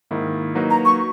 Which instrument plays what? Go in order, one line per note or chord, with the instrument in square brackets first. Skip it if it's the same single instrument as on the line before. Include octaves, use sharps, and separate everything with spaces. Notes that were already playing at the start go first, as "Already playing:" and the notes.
[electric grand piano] G#2 D#3 A#3 E4
F#3 A#3 D#4 F#4 B4
[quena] A#5
C#6